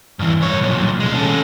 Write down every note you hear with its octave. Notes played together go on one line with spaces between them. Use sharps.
G2 E3
G2 C#5
B1 A#2
C2 G#3
C#4 A4